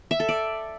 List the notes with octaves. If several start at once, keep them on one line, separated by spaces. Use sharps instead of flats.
E5
A4
D5